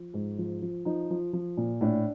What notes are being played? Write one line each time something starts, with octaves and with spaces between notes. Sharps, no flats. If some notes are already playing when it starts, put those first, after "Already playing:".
Already playing: F3
G#2
F3
F3
F3 D#4
F3
F3
A#2
A2 D4